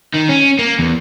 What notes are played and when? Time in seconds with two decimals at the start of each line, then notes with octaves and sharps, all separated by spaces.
0.14 D#3
0.29 C#4
0.59 A#3
0.79 E2